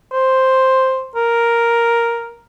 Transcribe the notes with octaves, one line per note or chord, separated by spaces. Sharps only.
C5
A#4